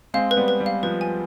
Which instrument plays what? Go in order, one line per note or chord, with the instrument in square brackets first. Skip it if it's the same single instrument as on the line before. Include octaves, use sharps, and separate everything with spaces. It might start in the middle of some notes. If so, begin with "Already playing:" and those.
[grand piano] G#3 C4 [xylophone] F5
[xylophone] B4
[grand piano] G3 B3
[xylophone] B4
[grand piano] G3
[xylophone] F5
[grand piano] F3 [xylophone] B4
[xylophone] G#5